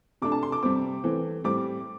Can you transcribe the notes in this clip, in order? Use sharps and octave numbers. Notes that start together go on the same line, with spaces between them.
C3 A3 D4 D6
A5
C6
D6
C3 G3 C4 D6
E3 A3 C4
A2 G3 C4 D6